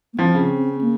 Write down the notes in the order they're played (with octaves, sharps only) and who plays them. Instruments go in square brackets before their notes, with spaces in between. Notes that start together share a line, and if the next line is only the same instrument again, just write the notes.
[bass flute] A#3
[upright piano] F3 [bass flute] C4
[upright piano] C#3
[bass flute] A#3